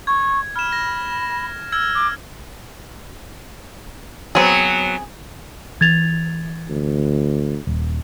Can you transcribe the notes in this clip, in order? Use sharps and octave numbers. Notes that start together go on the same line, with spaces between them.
C#6 G#6
B5 F6 E7
A#6
E6 F6 G#6
D6
F#3 B3 C4 G#4
E3 G#6 A6 F7
D2
D#1